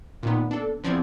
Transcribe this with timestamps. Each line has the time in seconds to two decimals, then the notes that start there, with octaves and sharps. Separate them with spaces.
0.23 A#2 D#3 B3
0.51 D4 A4
0.84 E2 F3 C4 D5 G#6